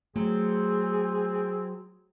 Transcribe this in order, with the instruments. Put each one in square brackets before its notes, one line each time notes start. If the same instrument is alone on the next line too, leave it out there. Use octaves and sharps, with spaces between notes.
[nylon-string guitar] F#3 [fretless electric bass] A3 [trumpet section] C4 [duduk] G#4